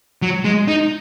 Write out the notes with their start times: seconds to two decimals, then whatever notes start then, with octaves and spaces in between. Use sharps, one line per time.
0.22 F#3
0.45 G#3
0.68 D#4